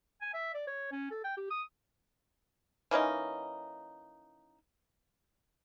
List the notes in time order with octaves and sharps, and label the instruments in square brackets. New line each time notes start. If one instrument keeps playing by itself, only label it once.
[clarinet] G#5
E5
D5
C#5
C#4
A4
G5
G4
D#6
[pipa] E3 A#3 C#4 D#4